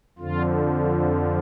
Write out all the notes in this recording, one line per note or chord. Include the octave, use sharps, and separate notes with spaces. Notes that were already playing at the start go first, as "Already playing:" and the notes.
F2 D3 F3 F4